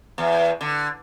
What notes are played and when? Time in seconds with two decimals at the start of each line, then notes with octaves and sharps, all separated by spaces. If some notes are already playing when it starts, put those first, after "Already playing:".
0.18 E2
0.61 D3